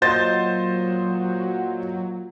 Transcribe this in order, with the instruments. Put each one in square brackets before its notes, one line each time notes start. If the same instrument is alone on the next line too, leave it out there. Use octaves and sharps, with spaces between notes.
[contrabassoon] A#2 [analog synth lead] F#3 [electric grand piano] C5 [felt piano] D#5 G6 A6